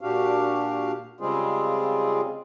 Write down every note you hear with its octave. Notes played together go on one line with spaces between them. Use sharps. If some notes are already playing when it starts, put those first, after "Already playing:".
A#2 D4 F#4 G4 F5
C#3 G3 G#3 C4 F4 G#4